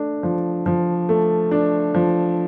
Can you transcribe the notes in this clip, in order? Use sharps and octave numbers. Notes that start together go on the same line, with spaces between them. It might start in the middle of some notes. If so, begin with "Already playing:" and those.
Already playing: A3 D4
F3
F3
A3
D4
F3